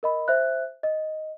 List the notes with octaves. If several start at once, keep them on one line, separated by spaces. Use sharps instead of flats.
A#4 D#5 B5
C5 E5 F#6
D#5